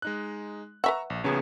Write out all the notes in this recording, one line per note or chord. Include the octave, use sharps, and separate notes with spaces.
G#3 D#4 F#6
B4 E5 F#5 A#5 C#6 E6
A#1
C#3 B3 G#4 C#5